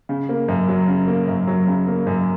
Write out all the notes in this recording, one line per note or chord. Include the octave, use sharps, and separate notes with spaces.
C#3
A#3
F#2
F#3
C#3
A#3
F#2
F#3
C#3
A#3
F#2